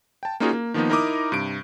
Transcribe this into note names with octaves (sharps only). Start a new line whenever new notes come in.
G5 A5
A#3 C#4 D#4 F4 F#4 G#4
A#3
D#3 F3 A#3 B3 D#4
D#4 E4 A#4 A#5 D6 D#6
G2 C3 D7